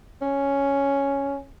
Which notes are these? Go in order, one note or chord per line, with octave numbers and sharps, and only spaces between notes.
C#4